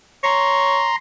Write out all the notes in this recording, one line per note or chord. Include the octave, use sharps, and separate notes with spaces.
C#5 A#5 C6